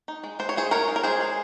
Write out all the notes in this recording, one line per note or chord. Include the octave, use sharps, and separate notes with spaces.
D#4
G#3
G#3 C5
C#5
D#4 G#4 C5
G#3 A#4 C#5
D#4
A#4
G#3 G#4 C5
G#3